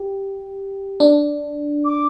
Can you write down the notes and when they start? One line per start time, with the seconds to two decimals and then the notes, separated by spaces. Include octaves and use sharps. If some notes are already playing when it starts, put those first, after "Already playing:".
Already playing: G4
1.00 D4
1.85 D6